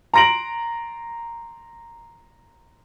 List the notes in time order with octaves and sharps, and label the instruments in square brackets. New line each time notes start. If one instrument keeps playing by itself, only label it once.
[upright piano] A#5 C6 A#6 D7 F#7